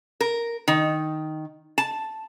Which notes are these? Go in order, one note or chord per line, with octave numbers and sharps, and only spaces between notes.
A#4
D#3
A5